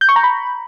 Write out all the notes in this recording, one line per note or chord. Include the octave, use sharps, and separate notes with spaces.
G6
C#6
A#5
B5